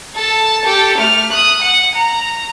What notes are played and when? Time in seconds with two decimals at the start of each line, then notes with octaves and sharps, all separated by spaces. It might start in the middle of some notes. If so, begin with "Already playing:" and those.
0.15 A4 A5
0.65 G4 A4
0.98 A3 F6
1.31 D#6 F#6
1.62 F#5
1.95 A#5